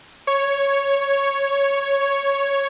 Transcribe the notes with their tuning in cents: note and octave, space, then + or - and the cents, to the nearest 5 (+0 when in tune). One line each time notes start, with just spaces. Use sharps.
C#5 +0